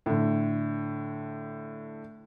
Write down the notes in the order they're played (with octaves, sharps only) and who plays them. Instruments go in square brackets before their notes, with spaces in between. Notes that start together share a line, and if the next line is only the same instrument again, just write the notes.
[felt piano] A2 D3